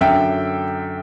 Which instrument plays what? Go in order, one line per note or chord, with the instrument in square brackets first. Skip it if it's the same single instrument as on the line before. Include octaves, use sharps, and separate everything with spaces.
[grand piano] F#2 D3 E5 G5